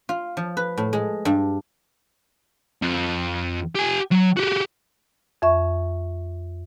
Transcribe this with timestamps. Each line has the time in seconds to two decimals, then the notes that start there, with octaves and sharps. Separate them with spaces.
0.09 F4
0.37 F3
0.57 B4
0.77 A2
0.93 G#3
1.25 G2
2.82 F2
3.75 G4 G#5
4.11 F#3
4.36 F#4 G4
5.42 F2 E5 C#6